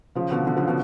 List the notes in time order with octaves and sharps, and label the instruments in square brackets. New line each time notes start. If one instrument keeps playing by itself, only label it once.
[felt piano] C#3 F3
B2 D3
B2 D3
C#3 F3
B2 D3